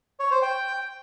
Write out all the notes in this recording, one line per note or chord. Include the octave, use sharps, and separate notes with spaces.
C#5
C5
G5